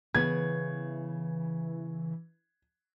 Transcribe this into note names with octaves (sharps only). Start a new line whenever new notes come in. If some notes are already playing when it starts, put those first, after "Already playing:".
C#3 E3 B3 G#6